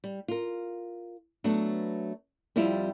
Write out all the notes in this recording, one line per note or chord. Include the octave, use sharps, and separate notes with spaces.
G3
F4 A#4
F#3 A3 B3 D4
F2 G3 C4 E4 F4